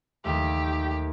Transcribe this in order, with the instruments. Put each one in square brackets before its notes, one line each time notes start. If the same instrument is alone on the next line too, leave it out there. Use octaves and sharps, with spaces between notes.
[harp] D#2 A3 [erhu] G4